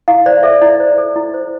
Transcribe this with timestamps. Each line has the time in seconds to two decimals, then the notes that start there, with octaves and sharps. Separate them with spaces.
0.08 E4 F5
0.26 C5 D5
0.43 A4 E5
0.62 E4 D5
0.80 C5
0.98 A4
1.16 E4
1.34 C5